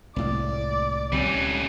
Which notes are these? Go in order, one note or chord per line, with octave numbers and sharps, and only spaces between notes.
C2 A2 G#3 D5
C#2 G3 C4 C#4